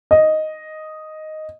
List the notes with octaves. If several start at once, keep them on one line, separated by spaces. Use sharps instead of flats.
D#5